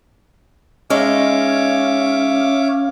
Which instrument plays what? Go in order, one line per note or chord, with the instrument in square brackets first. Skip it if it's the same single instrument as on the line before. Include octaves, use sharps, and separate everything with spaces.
[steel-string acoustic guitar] G#3 D#4 [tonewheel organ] C#4 F5 [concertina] C#5 E5 D6